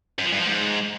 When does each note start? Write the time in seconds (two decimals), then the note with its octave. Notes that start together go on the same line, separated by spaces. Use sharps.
0.19 F#2
0.26 F3
0.32 G2
0.39 F3
0.46 G#2